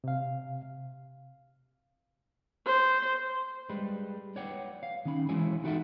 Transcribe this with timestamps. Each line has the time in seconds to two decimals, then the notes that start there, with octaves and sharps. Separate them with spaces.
0.04 C3 F5
2.67 C5
3.69 G3 G#3 B4
4.36 B4 C#5 D5 F#5 G5
4.83 F5
5.05 D#3 C#4 B5
5.29 E3 G#3 E4 F#4 C#5 G#5
5.64 D#4 F#4 G4 A4 E5 F#5